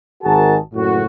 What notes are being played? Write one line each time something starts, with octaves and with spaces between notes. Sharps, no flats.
G#1 D#3 F#4 G#4 A#4 A5
F#1 A2 F#4